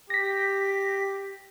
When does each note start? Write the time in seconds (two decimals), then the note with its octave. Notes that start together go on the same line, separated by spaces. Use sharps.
0.10 G4 A#6 B6